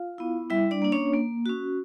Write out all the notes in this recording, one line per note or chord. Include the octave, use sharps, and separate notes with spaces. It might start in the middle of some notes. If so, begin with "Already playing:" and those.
Already playing: F4 F5
B3 E4
G3 E4 E5
D4 D5
A#3 D4
C#4 C#5
A#3
C#4 F#4